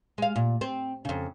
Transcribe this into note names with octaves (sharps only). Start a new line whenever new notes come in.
G#3 F5
A#2
C4
F2 C#3